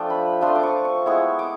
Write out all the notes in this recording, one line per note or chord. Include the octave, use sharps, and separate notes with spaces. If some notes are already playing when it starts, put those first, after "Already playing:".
Already playing: F3 A3 D4 F4 G5
B5
F3 A3 D4 F4 C6
D6
C#6
C#6
G#3 B3 E4 C#6
D6